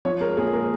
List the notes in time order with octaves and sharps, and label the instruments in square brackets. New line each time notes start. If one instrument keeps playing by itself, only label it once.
[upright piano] F3 C#5
G#3 A#4
A#2 G#4
G#3 A#4